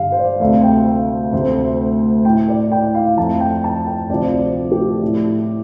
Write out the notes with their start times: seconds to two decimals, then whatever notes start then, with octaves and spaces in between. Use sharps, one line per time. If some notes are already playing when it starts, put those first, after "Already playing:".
Already playing: G2 D3 G3 F5
0.12 C5
0.18 D5
0.40 D2 C3 A3 F5
0.64 G5
0.86 F5
1.32 D2 C3 A3 C5
2.25 A2 A3 G5
2.48 D5
2.72 G5
2.94 F5
3.17 F2 F3 A3 A5
3.40 G5
3.64 A5
3.87 G5
4.09 D2 C3 F3 D5
4.72 G4
5.02 A2
5.07 A3